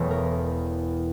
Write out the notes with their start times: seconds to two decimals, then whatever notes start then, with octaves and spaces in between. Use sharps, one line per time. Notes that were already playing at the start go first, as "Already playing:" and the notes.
Already playing: E1 E2 E3 A3 C#5
0.11 A#4